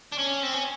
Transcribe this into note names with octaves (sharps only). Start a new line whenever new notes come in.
D4
C#4
C4
C#4